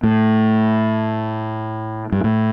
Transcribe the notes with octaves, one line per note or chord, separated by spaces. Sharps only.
A2
G2
A2